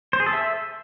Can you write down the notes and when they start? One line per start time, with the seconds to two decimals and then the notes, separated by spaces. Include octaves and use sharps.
0.13 C5
0.20 G#4
0.26 A4
0.33 E5